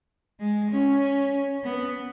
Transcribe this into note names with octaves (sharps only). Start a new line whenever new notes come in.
G#3
C#4
B3